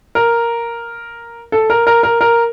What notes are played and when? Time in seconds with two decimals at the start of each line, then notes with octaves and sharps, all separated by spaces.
0.15 A#4
1.52 A4
1.70 A#4
1.87 A#4
2.03 A#4
2.21 A#4